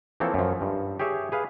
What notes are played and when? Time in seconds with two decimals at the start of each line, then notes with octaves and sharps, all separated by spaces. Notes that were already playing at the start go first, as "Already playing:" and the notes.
0.20 E3 F3 A#3 C4 A4 C#5
0.34 F#2 F3
0.61 G2
0.99 G4 G#4 C#5 E5
1.32 G#4 B4 F5